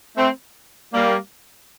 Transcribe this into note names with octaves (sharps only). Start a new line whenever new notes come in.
A3 C4
G3 A#3